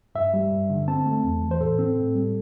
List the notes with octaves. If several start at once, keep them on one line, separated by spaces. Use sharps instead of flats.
G2 E5
G3
G2
D3
C4 A5
A3
E2
E3
C5
A2 A4
C4
A2
G3